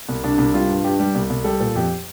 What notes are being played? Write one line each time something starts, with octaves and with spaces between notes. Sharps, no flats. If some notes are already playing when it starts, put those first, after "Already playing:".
C2
C2 D4
C2
G3 F4
G2
G2 G4
G3
C2
C2
G3 A4
A#2
F2 G4